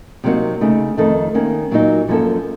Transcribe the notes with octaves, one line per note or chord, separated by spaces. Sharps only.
C3 F#3 A#3 D#4 F#4
C#3 A3 D#4
F2 D#3 A3 D#4 A4
D#3 A#3 C#4
A#2 F#3 A#3 D#4 A#4
F#2 F3 A#3 C#4 A4